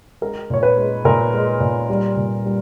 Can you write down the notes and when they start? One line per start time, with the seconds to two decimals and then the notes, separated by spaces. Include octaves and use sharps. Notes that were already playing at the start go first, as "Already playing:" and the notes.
0.21 G#3 A#4
0.50 A#2 C#5
0.63 B4
0.77 G#3
1.05 A#2 A#4
1.33 G#3
1.60 A#2
1.89 G3
2.16 A#2
2.45 G3